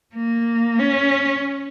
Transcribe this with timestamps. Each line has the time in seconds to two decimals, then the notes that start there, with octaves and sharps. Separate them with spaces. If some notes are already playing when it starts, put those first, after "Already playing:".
0.15 A#3
0.79 C#4